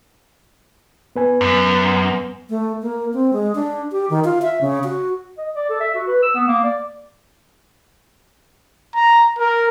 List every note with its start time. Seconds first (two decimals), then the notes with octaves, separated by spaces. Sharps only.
1.16 B3 B4 G#5
1.41 F#2
2.50 A3
2.82 A#3
3.13 C4
3.33 G#3
3.55 D4
3.92 G4
4.10 D#3
4.24 F4
4.42 E5
4.61 C#3
4.84 F#4
5.38 D#5
5.55 D5
5.69 A4
5.81 E5
5.94 F#4
6.07 B4
6.22 E6
6.35 B3
6.48 A#3
6.64 D5
8.95 A#5
9.39 A#4